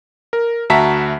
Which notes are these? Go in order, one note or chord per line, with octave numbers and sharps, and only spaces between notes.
A#4
D2 F#4 E5 A5 A#5 B6